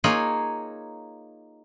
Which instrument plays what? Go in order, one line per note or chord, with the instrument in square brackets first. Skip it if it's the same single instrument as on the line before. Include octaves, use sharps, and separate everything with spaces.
[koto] A#3 D#4 F4 G#4 C#5